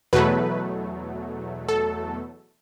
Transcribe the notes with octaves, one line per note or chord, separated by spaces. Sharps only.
E2 B2 F#3 A3 B4
A4